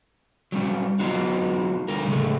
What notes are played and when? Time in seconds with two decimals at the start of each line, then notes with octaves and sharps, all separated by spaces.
0.52 F#3 G3 C#4
0.99 F#3 B3 D#4 F4 F#4
1.88 D3 G3 A#4
2.07 A2 C#3 G#3 A3